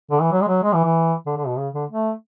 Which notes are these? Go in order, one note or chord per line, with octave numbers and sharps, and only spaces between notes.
D3
E3
F#3
G#3
F#3
G#3
E3
E3
D3
D3
B2
C#3
D3
A3